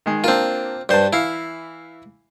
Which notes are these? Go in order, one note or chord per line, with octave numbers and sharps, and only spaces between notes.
D#3 G#3
A#3 C4 D4 F4
G2 B4 C5 A5
E3 E4 F5